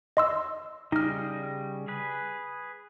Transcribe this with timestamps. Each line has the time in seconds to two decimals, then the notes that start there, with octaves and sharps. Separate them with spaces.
0.17 D#5 C6 E6
0.92 C#3 G3 D#4 D#5 F6
1.88 G#4 B4